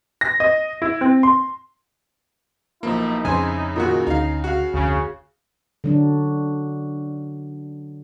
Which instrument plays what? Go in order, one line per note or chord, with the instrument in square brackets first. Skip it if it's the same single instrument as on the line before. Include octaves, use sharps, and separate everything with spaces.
[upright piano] A#6
D#5
E4
C4
C6
[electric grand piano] B1 F3 A#3 [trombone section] D#4 E4
[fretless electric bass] F2 F3 [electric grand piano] C#3 [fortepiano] C5 G#5
[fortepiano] A#2 D#3 F#4
[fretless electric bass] D2 [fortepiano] D#4 F5
[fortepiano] F#4 F5
[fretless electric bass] F1 D2 [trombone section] C#3
[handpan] D3 F#3 D4